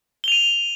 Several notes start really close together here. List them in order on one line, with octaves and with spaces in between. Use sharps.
G7 F7 D#7